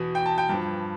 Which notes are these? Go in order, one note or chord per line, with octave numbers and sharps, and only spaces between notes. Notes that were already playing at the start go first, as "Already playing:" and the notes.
Already playing: E2 B2
G5
A5
G5
G2 F3